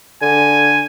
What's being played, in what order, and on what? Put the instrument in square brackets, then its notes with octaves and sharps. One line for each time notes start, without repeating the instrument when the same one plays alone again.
[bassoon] D3 [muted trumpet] G#5